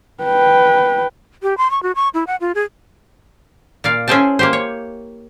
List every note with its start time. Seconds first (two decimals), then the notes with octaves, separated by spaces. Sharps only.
0.23 B4 G5
1.43 G4
1.58 C6
1.71 C#6
1.83 F#4
1.96 C#6
2.14 E4
2.27 F#5
2.41 F4
2.55 G#4
3.84 A#2 D5 F5
4.08 C#4 E4 G#4 C5 G5 A5
4.39 A#3 G4 C5
4.53 C#5